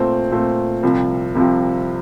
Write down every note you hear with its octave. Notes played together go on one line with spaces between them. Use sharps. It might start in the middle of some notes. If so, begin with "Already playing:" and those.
Already playing: A#2 A3 C4
A#2 A3 C4
C2 C3 F3
C2 C3 F3